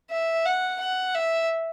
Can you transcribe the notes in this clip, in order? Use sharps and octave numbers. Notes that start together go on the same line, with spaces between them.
E5
F#5
F#5
E5